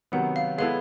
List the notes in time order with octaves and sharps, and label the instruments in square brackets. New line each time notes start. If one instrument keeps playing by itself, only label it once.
[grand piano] C3 D#3 F#3 B3 [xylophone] F#5
[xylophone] F5
[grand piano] G#3 B3 E4 A4 [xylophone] F5